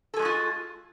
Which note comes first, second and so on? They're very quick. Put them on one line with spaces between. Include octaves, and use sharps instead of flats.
A4 G#4 G#3 F#4 F4